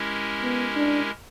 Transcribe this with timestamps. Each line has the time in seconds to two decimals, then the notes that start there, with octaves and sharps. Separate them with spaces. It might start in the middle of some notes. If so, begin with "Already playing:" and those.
Already playing: G#3 C#4 E4 G4 A#4
0.42 B3
0.76 D4